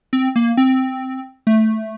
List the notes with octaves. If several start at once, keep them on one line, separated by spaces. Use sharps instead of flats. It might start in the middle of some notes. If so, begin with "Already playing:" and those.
C4
A#3
C4
A3